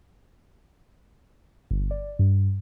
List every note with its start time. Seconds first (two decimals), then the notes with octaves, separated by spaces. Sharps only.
1.71 G1
1.91 D5
2.19 G2